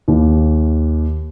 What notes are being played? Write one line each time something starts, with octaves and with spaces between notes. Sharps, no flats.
D#2